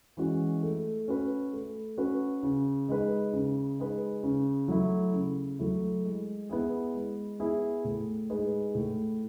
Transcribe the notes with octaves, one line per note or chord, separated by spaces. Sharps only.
E3 G#3 C#4 F#4
A3
C#4 F#4 B4
A3
C#4 F#4 B4
C#3
G#3 D#4 G#4 B4
C#3
G#3 D#4 G#4 B4
C#3
F#3 A3 E4
C#3
F#3 A3 E4
G#3
B3 E4 G#4
G#3
B3 E4 G#4
A2
G#3 D#4 G#4 B4
A2